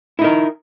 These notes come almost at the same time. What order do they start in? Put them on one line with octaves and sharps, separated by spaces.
E4 D#4 A#4